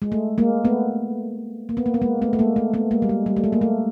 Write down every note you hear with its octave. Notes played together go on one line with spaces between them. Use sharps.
G#3
A3
G#3 A#3
A3 B3
A#3
B3
A#3
B3
G#3 A#3
A3 B3
A3
G#3 A#3
A3
A3 B3
G#3 A#3
G3
G#3
G3
A3
G#3
A#3
A3